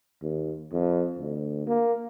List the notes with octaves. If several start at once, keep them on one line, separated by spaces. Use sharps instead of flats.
D#2
F2
D2
A#3